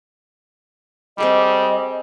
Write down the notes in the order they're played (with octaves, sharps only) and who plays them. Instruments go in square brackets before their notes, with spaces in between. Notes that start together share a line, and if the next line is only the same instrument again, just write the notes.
[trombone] G3 [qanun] C4 G#4 A4 [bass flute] D#5